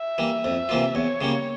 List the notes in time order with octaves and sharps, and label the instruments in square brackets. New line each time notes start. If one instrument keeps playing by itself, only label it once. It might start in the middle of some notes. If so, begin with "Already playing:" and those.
Already playing: [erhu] E5
[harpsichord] E3 G3 A#3
F2
C3 E3 A#3 F4
[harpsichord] E2 [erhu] C#5
[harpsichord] C#3 G3 A#3